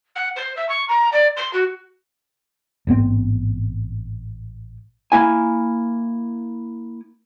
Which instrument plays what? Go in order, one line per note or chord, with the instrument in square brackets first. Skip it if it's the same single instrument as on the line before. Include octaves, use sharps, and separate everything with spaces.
[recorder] F#5
C5
E5
C#6
A#5
D5
C6
F#4
[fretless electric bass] A1 G#2 B3 C4
[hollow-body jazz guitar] A#3 E4 G#5